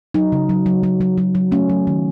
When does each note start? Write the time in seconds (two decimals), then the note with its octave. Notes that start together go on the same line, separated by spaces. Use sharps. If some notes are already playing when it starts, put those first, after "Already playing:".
0.14 F#3 D#4
0.32 C#3
0.49 F#3
0.66 F#3
0.83 F#3
1.01 F#3
1.18 F#3
1.35 F#3
1.52 A3 C#4
1.70 F#3
1.87 D#3